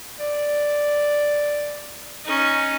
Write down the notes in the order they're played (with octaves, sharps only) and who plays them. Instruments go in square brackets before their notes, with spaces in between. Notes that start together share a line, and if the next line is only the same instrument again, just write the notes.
[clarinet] D5
[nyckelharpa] C#4 D#4